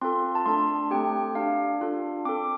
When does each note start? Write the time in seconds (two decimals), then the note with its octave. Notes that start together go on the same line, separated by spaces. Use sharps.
0.01 C4 F4 A4 C6
0.35 A5
0.46 A3 D4 A4 C6
0.91 A3 C4 G4 G5
1.35 D4 G4 F5
1.81 D4 F4 A4
2.25 C4 D6
2.29 A4